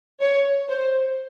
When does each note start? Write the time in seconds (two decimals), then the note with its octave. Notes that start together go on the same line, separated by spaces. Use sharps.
0.21 C#5
0.68 C5